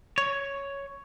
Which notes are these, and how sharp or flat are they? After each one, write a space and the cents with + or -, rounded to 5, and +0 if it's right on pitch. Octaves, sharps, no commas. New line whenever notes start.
C#5 +5